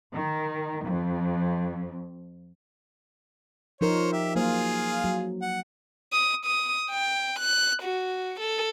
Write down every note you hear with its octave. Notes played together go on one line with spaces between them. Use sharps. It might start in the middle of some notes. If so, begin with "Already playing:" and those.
D#3
F2
F3 D#4 A#4 C5 C#5
G4 E5
F#3 A#3 F4 G#4 C5 F5
F#3
F#5
D#6
D#6
G5
F#6
F#4
A4